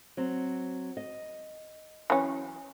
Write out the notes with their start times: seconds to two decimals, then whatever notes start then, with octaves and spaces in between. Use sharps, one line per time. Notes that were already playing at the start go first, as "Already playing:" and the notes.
0.17 F#3 C4
0.97 D#5
2.10 E3 F#3 C#4